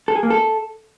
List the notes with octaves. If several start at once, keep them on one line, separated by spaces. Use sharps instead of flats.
A4
G#4
A#3
A4